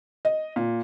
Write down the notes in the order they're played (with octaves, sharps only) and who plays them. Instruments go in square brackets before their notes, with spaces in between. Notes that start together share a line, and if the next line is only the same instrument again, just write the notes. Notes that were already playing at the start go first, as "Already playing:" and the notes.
[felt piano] D#5
A#2